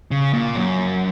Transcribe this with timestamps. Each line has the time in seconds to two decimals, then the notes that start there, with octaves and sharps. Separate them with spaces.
0.11 C#3
0.33 A#2
0.56 F#2